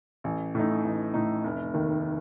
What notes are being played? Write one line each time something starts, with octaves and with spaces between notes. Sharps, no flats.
A1
A2 A3 D#4
A1
A2 A3 D#4
F1
D#2 D#3